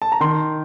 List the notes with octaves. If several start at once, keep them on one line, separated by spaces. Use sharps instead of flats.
A5
A#5
D#3 C6